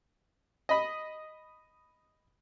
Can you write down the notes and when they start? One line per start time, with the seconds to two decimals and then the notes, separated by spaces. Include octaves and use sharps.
0.69 D#5 B5